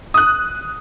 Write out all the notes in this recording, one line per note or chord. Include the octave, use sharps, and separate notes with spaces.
D#6 F#6